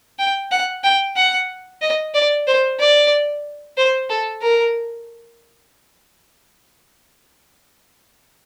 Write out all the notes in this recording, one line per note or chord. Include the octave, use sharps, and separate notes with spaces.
G5
F#5
G5
F#5
D#5
D5
C5
D5
C5
A4
A#4